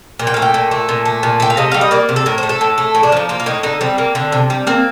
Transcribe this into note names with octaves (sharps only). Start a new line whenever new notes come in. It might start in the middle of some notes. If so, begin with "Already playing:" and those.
A#2
G5
F5
A3
G5
A#2
A3
A#2
A3
A#2
A3 G5
F5
C3 D#5
G3 F5
D#5
A#3 D5
C3
A4
A2 A#4
C5
A3
A4
A2
A3
A2
D4
F3 D#4
A#3 F4
F4
A2 D#4
D3 D#4
G3 C4
A#3
D3
C3
G3
A#3 C4